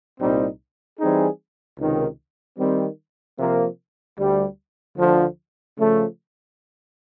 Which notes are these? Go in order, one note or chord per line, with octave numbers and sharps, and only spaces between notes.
C2 A#2 G3 C4 D#4
E3 G3 C4 D#4 G#4
C#2 C3 D#3
D#3 G3 C4
C3 F3 A#3
D2 D3 G3
D2 D3 F3
C#3 F3 A3